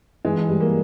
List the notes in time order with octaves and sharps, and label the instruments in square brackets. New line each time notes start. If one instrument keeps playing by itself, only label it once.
[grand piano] E3 [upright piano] G#3
[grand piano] G3
[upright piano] A#3